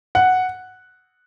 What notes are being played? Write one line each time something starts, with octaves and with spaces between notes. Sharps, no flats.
F#5